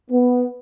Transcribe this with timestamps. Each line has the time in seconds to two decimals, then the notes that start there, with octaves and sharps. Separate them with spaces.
0.10 B3